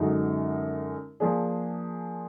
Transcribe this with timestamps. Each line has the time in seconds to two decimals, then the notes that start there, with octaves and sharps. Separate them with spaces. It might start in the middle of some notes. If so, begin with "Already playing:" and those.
Already playing: F#2 D3 G#3 D#4 F#4
1.20 F3 A#3 D4 G#4